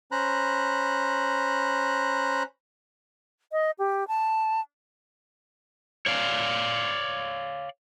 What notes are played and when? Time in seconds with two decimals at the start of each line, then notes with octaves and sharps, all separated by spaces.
0.12 C#4 C5 A#5 B5 F#6
3.52 D#5
3.79 G4
4.08 A5
6.06 C#5 D5 F5